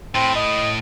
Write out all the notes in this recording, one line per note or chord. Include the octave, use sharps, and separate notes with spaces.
A2 C4
D#5